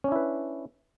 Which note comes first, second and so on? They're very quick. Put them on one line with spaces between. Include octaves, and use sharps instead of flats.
C#4 D4 E4 B4